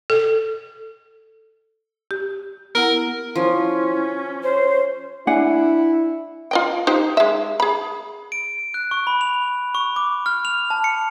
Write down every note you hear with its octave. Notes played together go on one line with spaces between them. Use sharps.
A4
G4
B3 E4 A#4 F#5
F3 C#4 E4
C5 C#5
D4 E4 F#5 G#5
F4 D#5 G5
D#4 G4 C5
G#3 E5
G#4 B5
D7
F#6
C#6
B5
F7
C#6
D6
F6
F7
A5
C#7